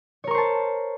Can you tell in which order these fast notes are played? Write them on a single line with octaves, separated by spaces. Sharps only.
C#5 A#4 C#6 C5 A5